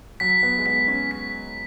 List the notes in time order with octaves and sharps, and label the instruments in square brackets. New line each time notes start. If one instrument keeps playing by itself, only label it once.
[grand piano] F#3 [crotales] B6
[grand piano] B3
G#3
[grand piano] B3 [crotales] B6
[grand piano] C#4
[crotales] B6